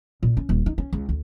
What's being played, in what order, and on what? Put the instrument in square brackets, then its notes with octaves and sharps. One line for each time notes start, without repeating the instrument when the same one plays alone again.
[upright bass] A#2
C#4
D#1
D#4
C#4
C#2
D2